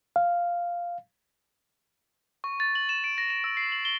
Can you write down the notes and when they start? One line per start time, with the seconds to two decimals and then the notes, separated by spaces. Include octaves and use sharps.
0.16 F5
2.44 C#6
2.60 A6
2.75 F#7
2.89 E7
3.04 D7
3.18 A#6
3.30 E7
3.44 E6
3.57 C7
3.72 F#7
3.85 G7